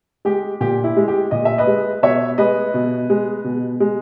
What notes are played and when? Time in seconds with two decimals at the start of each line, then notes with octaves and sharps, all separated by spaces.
0.25 G#3 G4
0.61 A#2 G4
0.84 E4
0.97 G#3
1.08 G4
1.31 A#2 D#5
1.45 E5
1.58 B4 D#5
1.67 G#3
2.03 B2 C#5 E5
2.38 G#3 B4 D#5
2.74 B2
3.10 G#3
3.44 B2
3.80 G#3